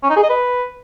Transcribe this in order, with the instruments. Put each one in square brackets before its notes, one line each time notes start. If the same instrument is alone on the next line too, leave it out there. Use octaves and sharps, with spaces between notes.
[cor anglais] C#4
D#4
G#4
D#5
B4